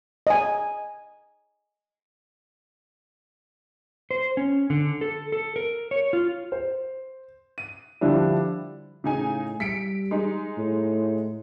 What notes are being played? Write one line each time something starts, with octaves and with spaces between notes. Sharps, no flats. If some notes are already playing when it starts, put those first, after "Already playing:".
D#5 G#5
C5
C#4
D3
A4
A4
A#4
C#5
F4
C5
D#7
D3 F3 G3 D4 E4
A2 C#3 D#4 G#5
G3 B6 C#7 D7
G#3 D#4
A2